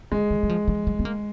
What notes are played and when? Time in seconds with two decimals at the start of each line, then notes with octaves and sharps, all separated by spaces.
0.12 D3 G#3
0.30 D#3
0.43 F#3
0.49 F3
0.68 F3
0.87 F#3
0.99 B3
1.05 A#3